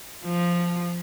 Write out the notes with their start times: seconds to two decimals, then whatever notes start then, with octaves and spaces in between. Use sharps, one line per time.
0.25 F3